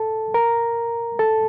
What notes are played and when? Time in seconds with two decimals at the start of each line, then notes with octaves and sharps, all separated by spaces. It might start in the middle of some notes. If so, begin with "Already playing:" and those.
Already playing: A4 A5
0.34 A#4 A#5
1.19 A4 A5